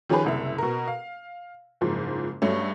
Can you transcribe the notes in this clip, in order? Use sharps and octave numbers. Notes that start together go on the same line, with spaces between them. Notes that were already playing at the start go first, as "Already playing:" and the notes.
D#3 F3 C#4 G4 G#4 B4
F#1 C2 E5
B2 A#4
F5
F#1 G#2 F3
G2 F#3 A3 C#4